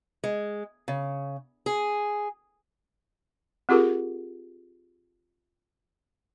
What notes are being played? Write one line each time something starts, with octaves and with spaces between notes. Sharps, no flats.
G#3
C#3
G#4
C4 F4 G4 G#4 A#4